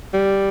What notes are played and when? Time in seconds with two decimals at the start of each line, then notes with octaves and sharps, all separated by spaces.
0.13 G3